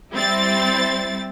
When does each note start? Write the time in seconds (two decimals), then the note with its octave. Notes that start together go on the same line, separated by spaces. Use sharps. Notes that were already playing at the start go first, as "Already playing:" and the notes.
0.13 G3 C4 E4 A6